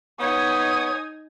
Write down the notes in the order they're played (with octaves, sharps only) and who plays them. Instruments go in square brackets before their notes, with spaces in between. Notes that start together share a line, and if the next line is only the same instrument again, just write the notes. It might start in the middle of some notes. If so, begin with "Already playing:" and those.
[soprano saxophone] B3 [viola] D#4 G#5 [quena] C#5 [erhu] D#6